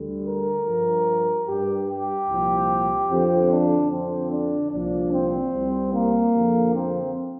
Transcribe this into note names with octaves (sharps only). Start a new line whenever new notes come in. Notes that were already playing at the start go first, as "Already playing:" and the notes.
Already playing: D2 D3 G3
A#4
G2 F3
G2 G3 G4
G4
C2 A#2 F3
F2 D3 F3 C4
D4
F2 D3 F3 C4
D4
C2 A#2 F3 D4
C4
C2 C3 G3
A#3
F2 D3 F3
C4